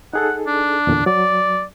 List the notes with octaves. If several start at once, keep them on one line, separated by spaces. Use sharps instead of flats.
D#4 G#4 A4 F#5
D4
E2 A#2 D3
F#3 D5